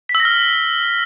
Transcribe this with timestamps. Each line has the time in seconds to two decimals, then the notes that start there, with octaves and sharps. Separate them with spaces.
0.09 B6
0.15 E6
0.20 A#6
0.25 F6